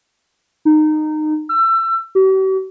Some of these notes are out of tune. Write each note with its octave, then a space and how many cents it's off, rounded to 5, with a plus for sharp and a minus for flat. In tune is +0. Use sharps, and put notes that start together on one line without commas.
D#4 -20
E6 +30
G4 -45